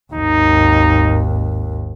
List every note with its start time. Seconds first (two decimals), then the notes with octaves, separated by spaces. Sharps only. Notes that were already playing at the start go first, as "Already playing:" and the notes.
0.14 G#1 D#2 D#4